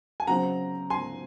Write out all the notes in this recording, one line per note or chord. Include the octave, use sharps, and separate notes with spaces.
G#5
C#3 F#3 C4 F#5 A#5
G#5 C6